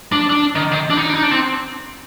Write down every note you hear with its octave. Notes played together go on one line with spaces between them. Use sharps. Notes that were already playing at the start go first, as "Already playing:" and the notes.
D4
D4
D#3
D#3
D4
D#4
D4
D#4
D4
C4